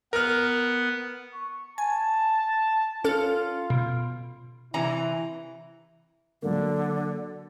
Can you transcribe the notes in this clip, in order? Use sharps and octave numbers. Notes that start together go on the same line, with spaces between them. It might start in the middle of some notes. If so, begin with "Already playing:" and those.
B3 A#4 B4 F6
C#6
G#5 A5
C#4 F4 A4 F6
B2
C3 E3 E4 A#5
D3 F#3 A#3